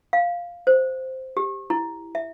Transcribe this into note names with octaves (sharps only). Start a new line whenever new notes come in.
F5
C5
G4
E4
E5